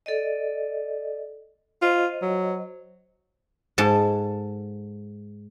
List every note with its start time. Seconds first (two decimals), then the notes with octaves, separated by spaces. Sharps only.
0.06 A4 D5 D#5
1.82 F4 C5 D#5
2.22 F#3
3.78 G#2 A4 A5